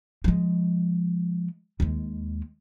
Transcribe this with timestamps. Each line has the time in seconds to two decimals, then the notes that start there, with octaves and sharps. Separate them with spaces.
0.24 F3 G#3
1.80 D#2 G#3